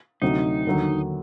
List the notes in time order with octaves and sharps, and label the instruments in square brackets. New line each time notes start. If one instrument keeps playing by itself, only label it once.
[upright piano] D2 C3 F#3 [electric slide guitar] D#4
[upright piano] D#2 D3 F#3